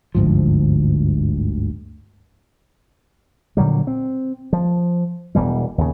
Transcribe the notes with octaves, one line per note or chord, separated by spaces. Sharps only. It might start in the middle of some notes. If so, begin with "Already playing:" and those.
G1 D2 G#2 F3
A#2 D3 F#3 G3
C4
F3
E1 B2 E3 G3
D#2 C#3